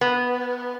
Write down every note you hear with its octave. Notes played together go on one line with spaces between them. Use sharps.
B3